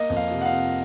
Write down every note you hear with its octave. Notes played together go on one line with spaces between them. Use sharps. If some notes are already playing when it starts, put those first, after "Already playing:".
Already playing: A#3 D#5
F2
F5
C3
F#5
F5
C3